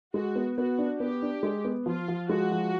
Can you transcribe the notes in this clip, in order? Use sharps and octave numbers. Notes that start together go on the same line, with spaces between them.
G#3 F#4
B3
B3 F#4
D4
B3 G4
D4
G#3
B3
F3 F4
F3
G#3 F#4
F3